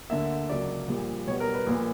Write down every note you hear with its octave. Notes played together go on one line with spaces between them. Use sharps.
D2 D3 A#3 E5
C#2 C#3 F#3 A#3 D5
A#1 A#2 G3 A#3
B1 B2 G3 B3 C#5
A#4
B4
A#1 A#2 A#3